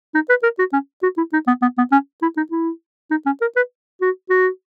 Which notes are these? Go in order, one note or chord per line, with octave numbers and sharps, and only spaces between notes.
D#4
B4
A#4
F#4
C#4
F#4
E4
D#4
B3
B3
B3
C#4
E4
D#4
E4
D#4
C#4
A#4
B4
F#4
F#4